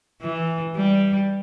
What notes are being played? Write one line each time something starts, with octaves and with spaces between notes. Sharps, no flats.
E3
G3